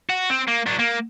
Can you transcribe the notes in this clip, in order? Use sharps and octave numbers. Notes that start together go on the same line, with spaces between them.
F#4
C4
A#3
F#3 D4
A#3